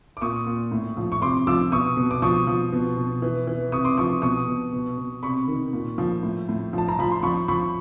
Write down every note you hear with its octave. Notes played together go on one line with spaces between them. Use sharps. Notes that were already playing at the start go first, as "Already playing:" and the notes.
D6
A#2 C#6 D#6
A#2
A2
F3
C#6
C3 C6 D6
F3 D6 E6
B2 C#6 D#6
B2
D6
F3 C#6 D#6
F3
B2
B2
E3
E3
C3 C#6 D#6
C6 D6
F3 C#6 D#6
B2 C#6 D#6
B2
B2
B2
C3 B5 C#6
D#3
A#2
F3
A2
A2
F3 A5
A#5
F3 B5
C6
F3 B5 C#6
F3 B5 C#6